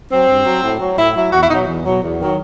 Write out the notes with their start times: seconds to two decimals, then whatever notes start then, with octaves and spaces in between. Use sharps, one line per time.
0.10 F#3 C4
0.28 G2
0.45 F#3
0.63 A2
0.80 F#3
0.97 A2 E4
1.15 F#3 E4
1.33 E2 F#4
1.41 E4
1.50 B2 D#4
1.54 F#3
1.67 E2
1.84 B2 F#3
2.02 E2
2.20 D#3 F#3